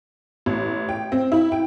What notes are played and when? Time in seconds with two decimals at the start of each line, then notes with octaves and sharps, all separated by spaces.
0.46 A1
0.89 G5
1.12 C4
1.32 E4
1.52 G5